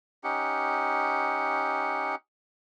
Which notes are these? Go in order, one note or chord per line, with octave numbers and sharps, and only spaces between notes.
C#4 D#4 G4 F#5